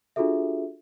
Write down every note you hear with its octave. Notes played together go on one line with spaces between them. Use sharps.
D4 F4 F#4 G#4 A4 E5